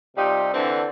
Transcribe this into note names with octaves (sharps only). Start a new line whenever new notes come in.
C3 G3 D#4 F4 G4
D3 E3 C4 D4